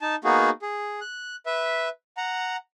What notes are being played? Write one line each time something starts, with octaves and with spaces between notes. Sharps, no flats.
D#4 A5
A#3 B3 D#4 F#4 G#4
G#4
F#6
B4 E5
F#5 A#5